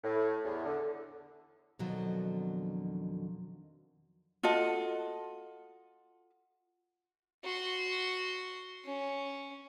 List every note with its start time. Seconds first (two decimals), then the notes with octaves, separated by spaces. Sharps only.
0.04 A2
0.45 E2
0.66 D3
1.79 F2 B2 D3 D#3 F3 F#3
4.43 F4 F#4 A4 D#5
7.44 F#4 C6
8.85 C#4